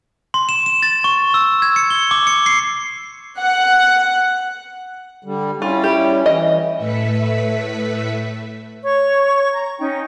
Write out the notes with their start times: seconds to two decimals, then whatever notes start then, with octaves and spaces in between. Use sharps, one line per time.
0.34 C6
0.49 E7
0.66 E7
0.83 A6
1.04 C#6
1.34 E6
1.62 G#6
1.76 C#7
1.90 G7
2.11 D6
2.27 C#7
2.46 C7
3.40 F#5 F#6
5.25 D3 G3
5.62 G3 C#4 E4 F4
5.84 G4
6.26 E3 D#5
6.76 A2 A3 B4 E5 B6 C#7
8.83 C#5 C#6
9.53 A#5
9.78 C#4 D#4 G5